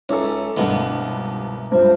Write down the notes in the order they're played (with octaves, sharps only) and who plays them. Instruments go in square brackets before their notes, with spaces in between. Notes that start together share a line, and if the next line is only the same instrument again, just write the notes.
[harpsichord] C#2 [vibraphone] G#3 A#5 D6 [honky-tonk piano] C#4 E4 A4
[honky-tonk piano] G1 C2 G2 [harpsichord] B2 A#3 B3
[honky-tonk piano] C2 G2 [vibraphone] F#3 F4 E5 [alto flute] C5